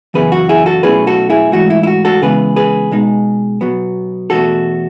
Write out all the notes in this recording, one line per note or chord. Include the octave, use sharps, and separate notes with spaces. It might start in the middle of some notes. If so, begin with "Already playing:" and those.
F#2 C#3 E3 B3 E4 G#4 B4
F#4
E4 G#4
F#4 A4
B2 F#3 A3 C#4 E4 G#4 B4
F#4 A4
E4 G#4
G#2 E3 A3 F#4
E4
E4
F#4
F#4 A4
C#3 E3 G#3 B3 G#4 B4
G#4 B4
B2 G#3 D#4
B2 F#3 B3
E2 B2 A3 F#4 A4